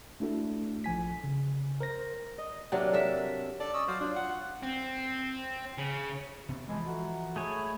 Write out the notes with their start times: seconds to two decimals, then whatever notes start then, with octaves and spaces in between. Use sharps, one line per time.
0.20 A3 D4 E4 F#4 A4
0.84 A#1 F3 G#5 B6
1.24 C#3
1.81 A#4 C5 A#6
2.38 D#5
2.72 C3 F#3 A#3 D4
2.93 A4 A#4 E5
3.60 A4 D5 A5
3.74 C#4 D#5 E6
3.88 F#3 C5 D5 F5
4.01 D4 F4
4.16 F#5
4.63 C4
5.78 C#3
6.49 C3 B3
6.69 E3 F3 G#3 A5 B5
6.86 F#4 A4 E5 A#5
7.36 A3 G#4 C#5 D#5 B5